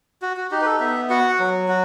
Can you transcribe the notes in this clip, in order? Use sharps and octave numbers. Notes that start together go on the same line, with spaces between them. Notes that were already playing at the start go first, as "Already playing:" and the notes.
F#4
F#4
D#4 G4
B4
A4
B3 E5
F#4 F#5
F#3
F#4